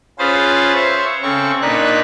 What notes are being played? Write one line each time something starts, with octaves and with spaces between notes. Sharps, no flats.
C#4 F4 G#4 B4 C5 A6
C5 C#5 E5
C#3 C4 A4 C#6
A#2 D4 D#4 B4 F#6